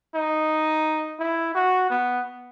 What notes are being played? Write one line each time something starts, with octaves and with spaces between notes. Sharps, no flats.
D#4
E4
F#4
B3